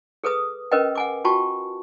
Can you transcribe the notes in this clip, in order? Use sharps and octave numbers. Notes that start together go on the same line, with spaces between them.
G#4 A4 B4 D#6
C#4 A#4 B4 D#5 G5
F#5 G#5 D6
F4 F#4 G5 A5 C#6